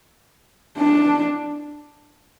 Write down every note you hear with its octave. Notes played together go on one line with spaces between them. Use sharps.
D4